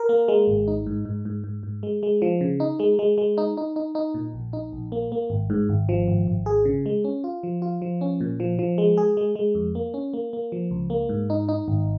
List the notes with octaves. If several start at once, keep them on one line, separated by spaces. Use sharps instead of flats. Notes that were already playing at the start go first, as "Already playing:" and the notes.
Already playing: A#4
A#3
G#3
G#1
D#4
G#2
G#2
G#2
G#2
G#2
G#3
G#3
F3
C#3
D#4
G#3
G#3
G#3
D#4
D#4
D#4
D#4
A#2
A#1
D#4
A#1
A#3
A#3
G#1
G#2
G#1
F3
G#1
G#1
G#4
C#3
G#3
C#4
F4
F3
F4
F3
C#4
A#2
F3
F3
G#3
G#4
G#3
G#3
F2
A#3
C#4
A#3
A#3
F3
C#2
A#3
G#2
D#4
D#4
G#1